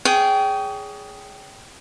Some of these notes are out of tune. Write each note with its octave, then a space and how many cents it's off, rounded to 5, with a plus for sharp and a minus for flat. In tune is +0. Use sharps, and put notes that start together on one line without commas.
G#4 +0 C#5 +35 G5 -15